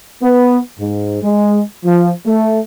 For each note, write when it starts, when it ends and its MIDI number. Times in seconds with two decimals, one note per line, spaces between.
0.22 0.58 59
0.79 1.18 44
1.22 1.62 56
1.84 2.11 53
2.26 2.59 57